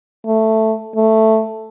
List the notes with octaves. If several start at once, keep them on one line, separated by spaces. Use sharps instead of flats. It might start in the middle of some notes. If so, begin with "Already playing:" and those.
A3
A3